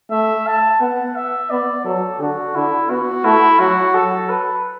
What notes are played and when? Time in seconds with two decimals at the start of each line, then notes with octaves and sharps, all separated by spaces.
0.11 A3 E5
0.47 A5
0.81 B3 F#5
1.16 E5
1.50 B3 D5
1.85 F#3 A4
2.20 D3 F#4
2.55 D3 E4
2.90 B3 F#4
3.25 A3 E4
3.59 F#3 F#4
3.94 F#3 A4
4.29 B4